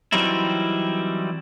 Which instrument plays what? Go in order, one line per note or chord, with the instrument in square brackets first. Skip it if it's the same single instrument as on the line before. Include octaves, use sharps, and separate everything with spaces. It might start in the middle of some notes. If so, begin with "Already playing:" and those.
[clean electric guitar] E3 F#3 G3 C4 D#4 E4